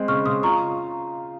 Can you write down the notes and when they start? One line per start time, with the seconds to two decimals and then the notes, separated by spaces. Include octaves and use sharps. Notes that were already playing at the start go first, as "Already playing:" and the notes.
Already playing: G#3 C4
0.08 C#3 C#6 F6
0.26 C#3 C6 D#6
0.43 F4 A#5 C#6